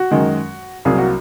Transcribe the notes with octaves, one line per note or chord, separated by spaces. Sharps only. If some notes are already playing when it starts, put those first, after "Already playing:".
Already playing: F#4
F#2 D#3 G#3
C2 C3 F#3 A#3 G#4
F#4